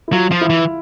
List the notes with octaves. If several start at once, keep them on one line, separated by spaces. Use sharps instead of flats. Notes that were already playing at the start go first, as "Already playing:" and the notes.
E4
F#3 F4
F3
E4
E3